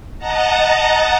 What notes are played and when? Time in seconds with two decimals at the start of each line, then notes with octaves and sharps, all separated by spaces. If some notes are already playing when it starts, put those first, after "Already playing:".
0.18 D#5 F#5 A5 A#5